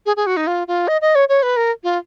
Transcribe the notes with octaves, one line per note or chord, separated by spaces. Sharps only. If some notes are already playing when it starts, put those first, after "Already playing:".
G#4
G#4
F#4
D#4
F4
F4
D#5
D#5
C#5
C#5
B4
A#4
F4